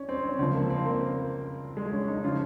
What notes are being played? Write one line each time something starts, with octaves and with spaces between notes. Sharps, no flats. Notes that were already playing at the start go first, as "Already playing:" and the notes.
Already playing: C#4
C4
C#4
C#2 C#3 F3 C4
A#3
C4
A#3
G#3
C#4
D#4
C#3 F3 F4